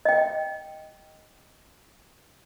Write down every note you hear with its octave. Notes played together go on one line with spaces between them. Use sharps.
D#5 G5